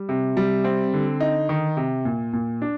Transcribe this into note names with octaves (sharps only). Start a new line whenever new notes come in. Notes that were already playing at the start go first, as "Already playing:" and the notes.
Already playing: G3
C3
G3
C4
D3
D#4
D#3
C3
A#2
A#2
D4